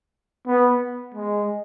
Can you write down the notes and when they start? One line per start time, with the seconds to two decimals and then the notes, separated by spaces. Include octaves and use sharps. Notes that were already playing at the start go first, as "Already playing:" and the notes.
0.47 B3
1.14 G#3